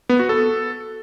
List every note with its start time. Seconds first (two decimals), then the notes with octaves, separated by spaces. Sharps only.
0.09 B3
0.19 F#4
0.29 A4